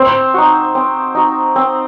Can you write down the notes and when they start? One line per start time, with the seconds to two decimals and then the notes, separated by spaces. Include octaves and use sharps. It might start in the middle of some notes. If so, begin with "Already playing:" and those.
Already playing: C4 C5
0.34 D#4 F#4
0.75 C4
1.15 D#4 F#4
1.56 C4